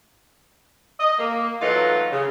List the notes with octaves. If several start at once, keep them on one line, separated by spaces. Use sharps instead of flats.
D#5
A#3
E3 F#3 A3 D#4 F4 F#4
C#3